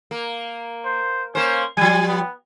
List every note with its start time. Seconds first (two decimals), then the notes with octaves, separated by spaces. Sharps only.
0.11 A#3
0.85 C5
1.35 A#3 C#4 C5
1.77 F3 G3 G#5
2.08 B3